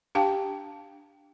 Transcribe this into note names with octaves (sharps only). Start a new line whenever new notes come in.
D4 G4 F5 G5 A5